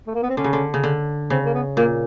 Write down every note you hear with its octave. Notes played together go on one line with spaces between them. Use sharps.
A3
A#3
B3
C4
D3 C#4
C#3
D3
C#3
D3
C#3 C4
A#3
B3
A#2 A#3